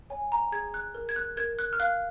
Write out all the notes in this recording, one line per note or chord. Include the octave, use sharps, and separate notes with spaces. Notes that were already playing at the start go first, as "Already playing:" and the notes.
C#5 G#5
A#5
G#4 G#6
F#6
A#4
G#6
F#6
A#4 G#6
F#6
F6
F5 F#6